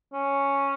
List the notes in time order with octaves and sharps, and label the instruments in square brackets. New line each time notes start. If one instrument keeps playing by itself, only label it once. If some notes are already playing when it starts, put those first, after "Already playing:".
[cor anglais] C#4